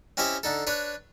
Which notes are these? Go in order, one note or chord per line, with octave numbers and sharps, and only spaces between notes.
C4 C#4 E4 G4 D#5 E5
D3 D#4 A4
D4 B4 C#5